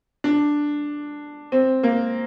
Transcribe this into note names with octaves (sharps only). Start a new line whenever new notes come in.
D4
C4
A#3